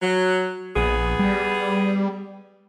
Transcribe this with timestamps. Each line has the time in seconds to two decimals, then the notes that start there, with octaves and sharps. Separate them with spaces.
0.02 F#3
0.76 A#1 B3 G#4
1.19 G3